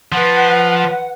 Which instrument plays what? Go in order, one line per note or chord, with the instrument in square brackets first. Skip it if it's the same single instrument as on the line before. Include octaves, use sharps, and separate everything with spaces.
[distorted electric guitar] F3 [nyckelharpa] B4 [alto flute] F#5